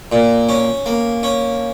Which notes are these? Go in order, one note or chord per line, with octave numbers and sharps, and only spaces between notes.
A#2
C#4
A#3
C#4